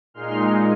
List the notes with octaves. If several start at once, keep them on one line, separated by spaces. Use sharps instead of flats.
A#2 G#3 D#4 C6 F6